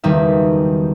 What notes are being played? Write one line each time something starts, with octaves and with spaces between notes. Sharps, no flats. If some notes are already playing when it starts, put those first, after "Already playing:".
F#1 E2 D#3 G3 D#4 E5